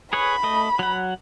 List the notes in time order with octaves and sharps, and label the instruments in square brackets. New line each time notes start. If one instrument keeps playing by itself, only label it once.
[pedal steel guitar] G#4 B4 C#5 [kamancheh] B5
[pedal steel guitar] A3 D#5
F#3 F#5